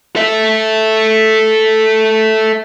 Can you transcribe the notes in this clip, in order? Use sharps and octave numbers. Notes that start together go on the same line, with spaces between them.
A4 E5